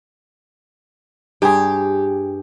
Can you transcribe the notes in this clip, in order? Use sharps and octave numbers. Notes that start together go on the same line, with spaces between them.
G2 G4 G#4